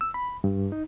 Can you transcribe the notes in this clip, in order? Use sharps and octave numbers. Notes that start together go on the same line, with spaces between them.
E6
B5
G2
D#4